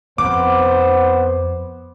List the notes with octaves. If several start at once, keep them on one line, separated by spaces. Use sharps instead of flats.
F2 B3 C5 D6